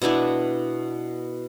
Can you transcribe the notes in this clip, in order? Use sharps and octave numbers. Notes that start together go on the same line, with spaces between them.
B2 B3 D4 E4